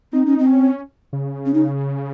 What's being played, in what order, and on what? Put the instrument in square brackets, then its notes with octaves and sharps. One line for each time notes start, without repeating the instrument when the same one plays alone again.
[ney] C4 [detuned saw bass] D#4
[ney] C#4
C4
[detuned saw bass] C#4
C#3
[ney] C#4
D#4